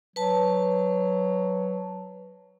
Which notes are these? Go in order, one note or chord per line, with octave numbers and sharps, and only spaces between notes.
F#3 B4 A5